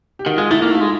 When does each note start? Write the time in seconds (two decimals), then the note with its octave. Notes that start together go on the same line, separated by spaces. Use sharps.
0.19 G4
0.26 D#3 F#4
0.38 G#3 F4
0.51 A3 E4
0.62 A#3 D#4
0.71 A3 F4
0.81 G#3